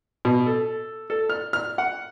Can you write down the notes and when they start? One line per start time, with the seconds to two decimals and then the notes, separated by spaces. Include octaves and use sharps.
0.25 B2
0.46 A4
1.10 A4
1.30 F6
1.53 F6
1.78 F#5